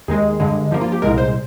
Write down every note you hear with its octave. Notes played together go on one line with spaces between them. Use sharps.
D#2 D#3 G#3 G#4
G2 D3 G#3
G2 F3 A#3
F4
G4
C2 A#2 G#3 A#4
C5